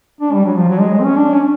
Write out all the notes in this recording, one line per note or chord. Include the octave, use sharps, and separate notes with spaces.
D4
G3
F#3
F3
F#3
G#3
G#3
C4
C#4
D4
C#4